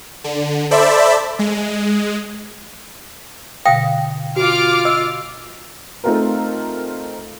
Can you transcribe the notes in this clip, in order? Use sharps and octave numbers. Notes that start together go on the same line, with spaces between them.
D3
A4 C5 D5 E5 B5
G#3
B2 D3 F5 G5 D#6 A#6
F4 F#4 D6 F6
D#5 E6
A3 C4 D#4 F4 G#4 A#4